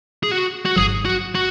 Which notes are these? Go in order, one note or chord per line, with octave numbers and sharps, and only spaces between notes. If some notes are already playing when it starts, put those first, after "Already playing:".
G#4
F#4
F#4
G#1 G#2 F#3 G#4
F#4
F#4